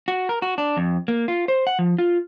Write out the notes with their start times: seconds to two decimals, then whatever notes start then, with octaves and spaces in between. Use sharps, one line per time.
0.08 F#4
0.29 A#4
0.42 F#4
0.58 D4
0.77 F2
1.08 A#3
1.28 F4
1.48 C5
1.67 F#5
1.79 F3
1.98 F4